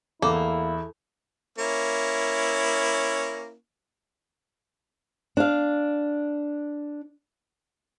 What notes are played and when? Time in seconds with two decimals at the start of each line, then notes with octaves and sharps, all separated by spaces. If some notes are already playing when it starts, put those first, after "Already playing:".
0.22 E2 A#3 E4 A4
1.58 A#3 C#4 E4
5.37 D4 F5